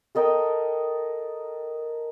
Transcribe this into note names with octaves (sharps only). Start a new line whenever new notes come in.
A4 A#4 D#5 G5